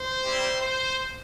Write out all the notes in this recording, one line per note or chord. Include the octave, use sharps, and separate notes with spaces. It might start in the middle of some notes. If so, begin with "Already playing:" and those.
Already playing: C5
G3 C4 E4 G4
C5